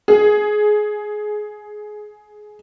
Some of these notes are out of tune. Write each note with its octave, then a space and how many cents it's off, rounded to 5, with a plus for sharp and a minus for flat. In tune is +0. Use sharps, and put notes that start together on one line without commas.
G#4 +15